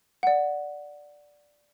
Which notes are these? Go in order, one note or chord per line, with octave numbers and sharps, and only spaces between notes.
D5 F#5